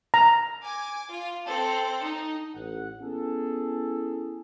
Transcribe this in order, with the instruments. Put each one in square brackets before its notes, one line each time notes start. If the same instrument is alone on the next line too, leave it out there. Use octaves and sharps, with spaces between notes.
[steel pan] A#5
[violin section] G#5 D6
F4
C4 A4
D#4
[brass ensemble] A1 F#5
B3 C#4 E4 G#4 A4